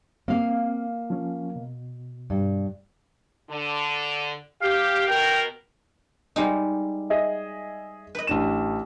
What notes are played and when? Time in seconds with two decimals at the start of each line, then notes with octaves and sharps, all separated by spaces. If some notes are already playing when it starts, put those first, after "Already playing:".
0.28 A#3 C4 F5
1.10 F3 C#4
1.56 B2
2.30 G2
3.50 D3
4.61 G4 F5
5.08 B2 A#4 G5
6.36 G3 G#3 D#4
7.10 G#4 D#5 E5
8.15 B4 D#5
8.27 A1 D4 E7